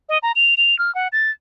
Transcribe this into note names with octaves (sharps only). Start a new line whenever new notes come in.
D#5
A#5
F7
F7
F6
F#5
A6